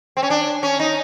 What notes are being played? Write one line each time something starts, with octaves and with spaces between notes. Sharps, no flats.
C4
C#4
D4
C#4
D#4